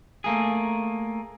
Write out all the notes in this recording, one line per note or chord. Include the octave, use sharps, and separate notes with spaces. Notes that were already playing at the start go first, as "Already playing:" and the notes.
A3 A#3 G#4